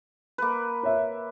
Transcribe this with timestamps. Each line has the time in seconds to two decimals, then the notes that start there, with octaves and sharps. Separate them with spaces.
0.38 A#3 B4
0.83 C#5 E5